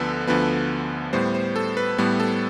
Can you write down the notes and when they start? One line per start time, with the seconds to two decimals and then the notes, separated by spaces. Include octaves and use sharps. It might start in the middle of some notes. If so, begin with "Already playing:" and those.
Already playing: D2 D3 F3 B3 A4 B4
0.27 D2 D3 F3 B3 B4
1.13 A2 G3 B3 C5
1.35 C5
1.56 A4
1.77 B4
1.98 A2 G3 B3 B4
2.20 A4